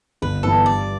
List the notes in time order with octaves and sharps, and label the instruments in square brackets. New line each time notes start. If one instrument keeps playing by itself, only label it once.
[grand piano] G1 [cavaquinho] B4
[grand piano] G2 E3 B3 [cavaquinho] A4
[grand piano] G2 [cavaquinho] D5